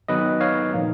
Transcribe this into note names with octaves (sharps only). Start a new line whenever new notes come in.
D#3 F#3 B3 D#4 B4 D#5
C#5 F5
A#2 F3 A#3 D#4